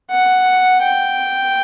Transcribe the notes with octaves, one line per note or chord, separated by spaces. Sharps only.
F#5
G5